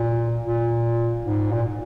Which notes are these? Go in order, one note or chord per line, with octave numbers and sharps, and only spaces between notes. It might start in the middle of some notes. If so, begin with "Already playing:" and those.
Already playing: A#2
A#2
G#2
A#2